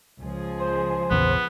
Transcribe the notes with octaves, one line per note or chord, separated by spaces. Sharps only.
C#2 F3 G#4
C5
A#1 E2 C#3 B3